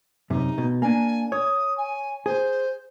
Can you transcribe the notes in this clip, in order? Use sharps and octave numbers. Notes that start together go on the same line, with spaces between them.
F#2 C3 D#4
B2
A#3 D4 G#5
C#5 D#6
G#5
G#4 C5